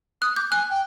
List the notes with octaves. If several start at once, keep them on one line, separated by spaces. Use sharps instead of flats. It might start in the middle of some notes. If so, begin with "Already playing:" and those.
D#6 F#6
D6 G6
G#5 F#6
G5